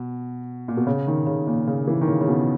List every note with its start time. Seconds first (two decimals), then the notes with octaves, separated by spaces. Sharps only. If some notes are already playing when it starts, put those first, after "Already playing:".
Already playing: B2
0.68 A#2
0.77 B2
0.87 C#3
1.07 D#3
1.27 C#3
1.47 A#2
1.67 C#3
1.88 E3
2.01 D#3
2.08 C#3
2.21 C#3
2.28 B2